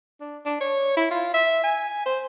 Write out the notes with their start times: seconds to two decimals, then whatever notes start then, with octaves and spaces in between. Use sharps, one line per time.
0.21 D4
0.46 D4
0.61 C#5
0.97 E4
1.11 F4
1.34 E5
1.64 G#5
2.06 C5